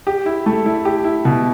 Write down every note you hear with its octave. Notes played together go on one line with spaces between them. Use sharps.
G4
E4
A3
E4
G4
E4
B2